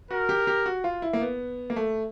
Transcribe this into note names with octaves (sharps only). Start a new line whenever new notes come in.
F#4 A#4
G4
G4
F#4
F4
E4
A#3
B3
A#3
A3